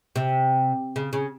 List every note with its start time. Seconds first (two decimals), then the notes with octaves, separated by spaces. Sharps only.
0.16 C3
0.96 C#3
1.13 C#3